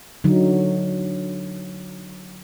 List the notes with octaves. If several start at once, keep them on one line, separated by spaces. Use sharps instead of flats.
D3 F#3 D#4